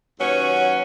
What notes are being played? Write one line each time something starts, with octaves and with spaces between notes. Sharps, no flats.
D#2 F#3 C#4 B4 C#5